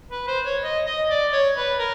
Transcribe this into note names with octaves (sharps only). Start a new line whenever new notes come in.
B4
C5
C#5
D#5
D#5
D5
C#5
B4
A#4